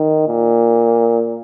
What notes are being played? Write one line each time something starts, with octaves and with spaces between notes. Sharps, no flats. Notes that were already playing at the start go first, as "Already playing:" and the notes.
Already playing: D#3
A#2